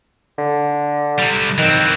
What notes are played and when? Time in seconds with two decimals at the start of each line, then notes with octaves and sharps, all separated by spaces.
0.38 D3
1.19 C3 G3
1.58 D#3 E3 C4